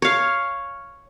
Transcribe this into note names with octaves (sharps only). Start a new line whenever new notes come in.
C#5 F5